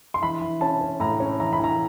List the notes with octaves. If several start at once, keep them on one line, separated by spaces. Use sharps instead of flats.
C6
E3 B5
E3
C#4 A5
C#4
A2 A#5
C#4
E3 A#5
B5
E3 A#5